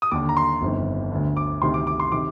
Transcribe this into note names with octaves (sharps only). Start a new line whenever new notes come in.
D#6
D#2 D3 D6
A#5
C6
G1 F2 D#3
D2 D3
D6
D2 C3 D#3 C6
D6
D6
C6
C3 D#3 D6